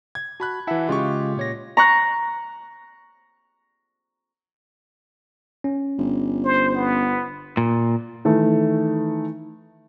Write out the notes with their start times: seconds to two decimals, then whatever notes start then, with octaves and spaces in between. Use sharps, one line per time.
0.15 G#6
0.40 F#4 A5 B5 F#6
0.67 E3 E4 E5 F#5 A5
0.89 C#3 G#3 F4 G4 C#6
1.37 A#2 C#5 A#6
1.77 A#5 C#6 F#6
5.64 C#4
5.98 G1
6.45 C5
6.75 B3
7.57 A#2
8.25 D#3 E3 A3